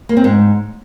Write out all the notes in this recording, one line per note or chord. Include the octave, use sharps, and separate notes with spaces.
A#3
C4
G#2